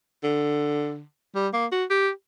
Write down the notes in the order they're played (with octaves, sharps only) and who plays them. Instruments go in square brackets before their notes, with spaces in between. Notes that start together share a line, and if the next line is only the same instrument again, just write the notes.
[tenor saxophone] D3
G3
A#3
F#4
G4